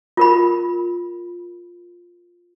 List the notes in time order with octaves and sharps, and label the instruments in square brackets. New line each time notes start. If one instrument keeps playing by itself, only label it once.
[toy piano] F4 A#4 B5